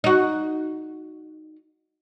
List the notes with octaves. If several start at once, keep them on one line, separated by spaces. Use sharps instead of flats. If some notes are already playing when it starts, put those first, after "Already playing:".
D#4 F#4